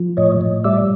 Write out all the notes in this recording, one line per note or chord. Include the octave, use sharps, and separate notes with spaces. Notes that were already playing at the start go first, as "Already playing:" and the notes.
Already playing: F3
A2 C#5 D#5
A2
G3 D5 E5